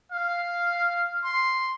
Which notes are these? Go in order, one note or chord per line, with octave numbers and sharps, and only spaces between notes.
F5
C6